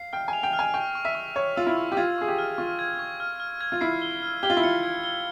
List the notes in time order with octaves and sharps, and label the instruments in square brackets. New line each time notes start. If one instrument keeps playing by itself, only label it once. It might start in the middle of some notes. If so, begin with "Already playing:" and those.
Already playing: [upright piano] F5 [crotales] C7
[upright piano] G5 [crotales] F6
[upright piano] G#5
[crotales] F7
[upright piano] G5
[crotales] F6
[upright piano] G#5
[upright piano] G5 [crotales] C#6
[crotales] C#6
[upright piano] E5
[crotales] C#6
[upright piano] C#5 [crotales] C#6
[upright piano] F4 [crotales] E6
[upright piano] E4
[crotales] C#6
[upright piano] G4
[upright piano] F4 [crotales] G#6
[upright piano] G#4 [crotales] C#6
[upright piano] G4
[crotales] F6
[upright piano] F4 [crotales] C#6
[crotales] G#6
C#6
F6
F6
G#6
[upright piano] F4
[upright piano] E4 [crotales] C7
[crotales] G7
F6
[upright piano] G4 [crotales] G7
[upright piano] F4
E4
[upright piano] F4 [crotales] C#7
[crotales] G#6
G7